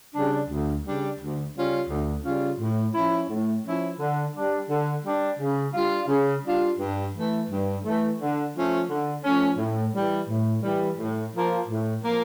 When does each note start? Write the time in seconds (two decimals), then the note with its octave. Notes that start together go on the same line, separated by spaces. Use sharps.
0.14 C#3 G3 D4
0.49 D2
0.83 C#3 G3 D4
1.19 D2
1.53 C#3 G3 C#4 F4
1.88 D2
2.24 C#3 G3 C#4 F4
2.59 A2
2.94 F3 C#4 E4
3.29 A2
3.64 F3 C#4 E4
3.99 D3
4.34 G3 D4
4.68 D3
5.03 G3 D4
5.39 C#3
5.74 G3 D4 F4
6.08 C#3
6.44 G3 D4 F4
6.78 G2
7.14 E3 A3
7.49 G2
7.84 E3 A3
8.19 D3
8.54 F3 A3 C#4
8.89 D3
9.23 F3 A3 C#4
9.58 A2
9.94 E3 G3
10.28 A2
10.63 E3 G3
10.98 A2
11.33 F3 A#3
11.68 A2
12.03 F3 A#3